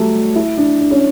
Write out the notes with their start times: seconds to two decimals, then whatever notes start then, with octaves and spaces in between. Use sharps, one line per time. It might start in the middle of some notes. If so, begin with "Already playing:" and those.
Already playing: F#3 G3 A3
0.36 E4
0.58 D4
0.80 D4
0.91 C#4